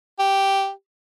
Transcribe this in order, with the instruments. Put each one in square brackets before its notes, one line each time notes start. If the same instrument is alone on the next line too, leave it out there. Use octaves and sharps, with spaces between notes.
[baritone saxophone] G4